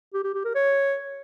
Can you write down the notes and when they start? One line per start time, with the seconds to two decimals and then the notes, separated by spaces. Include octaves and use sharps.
0.13 G4
0.24 G4
0.34 G4
0.45 A#4
0.55 C#5